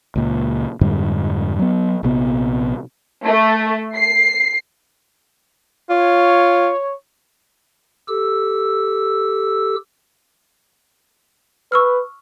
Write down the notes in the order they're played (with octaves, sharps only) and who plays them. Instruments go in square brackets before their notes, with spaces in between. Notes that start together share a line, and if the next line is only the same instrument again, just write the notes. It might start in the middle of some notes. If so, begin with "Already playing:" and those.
[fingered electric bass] C#2 A#2
F2 G#2 D3 G3
F#3 B3
A#1 C3 B3
[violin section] A3
C7
[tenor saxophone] F4 [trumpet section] C#5
[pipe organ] G4 A4 E6
[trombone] B4 [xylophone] C#6 E6 F6